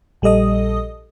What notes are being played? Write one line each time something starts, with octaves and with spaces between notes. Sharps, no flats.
A#1 G3 A4 D#5 D#6